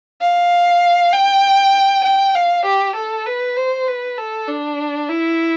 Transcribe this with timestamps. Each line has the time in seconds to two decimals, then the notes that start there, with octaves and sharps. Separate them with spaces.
0.21 F5
1.13 G5
2.04 G5
2.35 F5
2.65 G4
2.96 A4
3.26 B4
3.57 C5
3.87 B4
4.18 A4
4.48 D4
5.09 E4